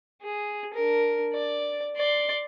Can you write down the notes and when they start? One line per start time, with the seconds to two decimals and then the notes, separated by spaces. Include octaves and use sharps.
0.22 G#4
0.74 D4 A#4
1.33 D5
1.96 D5 C6